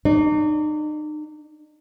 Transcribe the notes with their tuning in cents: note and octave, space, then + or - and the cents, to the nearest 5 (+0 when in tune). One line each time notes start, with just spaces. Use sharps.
D#4 -40 D5 -30